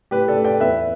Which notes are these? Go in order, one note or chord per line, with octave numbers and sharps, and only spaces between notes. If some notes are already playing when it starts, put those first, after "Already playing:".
A2 G4 B4
A4 D5
A3
D5 G5
E2 B4 E5